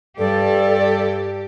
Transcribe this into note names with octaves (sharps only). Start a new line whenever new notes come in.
G2 G4 A4 D5